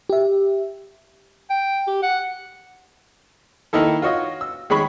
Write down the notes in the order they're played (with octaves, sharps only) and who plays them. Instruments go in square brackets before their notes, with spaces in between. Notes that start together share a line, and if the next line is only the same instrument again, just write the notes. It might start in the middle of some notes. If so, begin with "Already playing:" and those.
[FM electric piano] G4 E5
[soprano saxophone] G5
G4
F#5
[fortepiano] D#3 A#3 D#4 E4 A4
F4 F#4 C#5 D#5
E6
D#3 G#3 C#5 B5 C#6